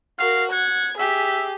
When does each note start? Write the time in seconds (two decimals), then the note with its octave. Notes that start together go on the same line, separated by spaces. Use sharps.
0.19 F#4 A#4 F5
0.52 F#5 G#6
0.98 G4 G#4 E5